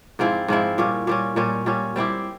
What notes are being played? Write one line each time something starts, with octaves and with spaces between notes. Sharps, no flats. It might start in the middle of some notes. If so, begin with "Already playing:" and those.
G#2 F3 C4 E4
G#2 F3 C4 E4
A#2 G3 C#4
A#2 G3 C#4
A#2 G3 C#4
A#2 G3 C#4
G3 C4 E4 G4